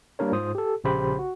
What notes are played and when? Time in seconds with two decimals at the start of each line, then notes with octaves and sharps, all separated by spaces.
0.19 G3 A#3 D4 A#4 C#5
0.32 G#2 F4 C5 D#6
0.55 G4 A4
0.84 A#1 C#3 G4 C5 B5
1.19 F#4